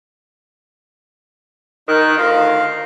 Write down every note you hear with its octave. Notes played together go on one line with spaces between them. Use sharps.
D#3 D#4 F#6
D2 D#3 F4 F5